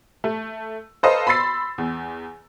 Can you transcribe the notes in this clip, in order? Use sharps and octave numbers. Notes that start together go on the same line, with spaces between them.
A3
A4 B4 C5 D#5 F5 A#5
B5 C6 E6 A6 C7
E2